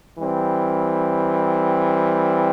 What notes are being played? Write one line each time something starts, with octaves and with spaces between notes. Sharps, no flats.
E3 G3 C4